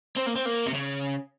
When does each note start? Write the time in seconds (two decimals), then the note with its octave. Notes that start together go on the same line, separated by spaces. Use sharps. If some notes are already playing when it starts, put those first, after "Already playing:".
0.16 C4
0.26 A#3
0.36 C4
0.46 A#3
0.67 C3
0.74 C#3